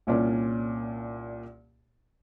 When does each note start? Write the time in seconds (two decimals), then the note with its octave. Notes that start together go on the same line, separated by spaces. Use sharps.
0.07 C2 A#2 C#4 D5